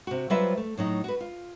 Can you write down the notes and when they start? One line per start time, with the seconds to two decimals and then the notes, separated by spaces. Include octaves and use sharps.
0.07 C3 F#4
0.30 F#3 G3 F4 B4 C5 E5
0.57 A3
0.78 A2 F#3 D#4
1.04 F#4 B4
1.20 F4